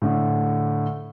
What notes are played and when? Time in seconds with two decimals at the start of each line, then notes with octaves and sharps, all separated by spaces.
0.02 A2 D3